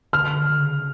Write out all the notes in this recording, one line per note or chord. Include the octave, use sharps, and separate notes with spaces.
D3 F6
D3
C#3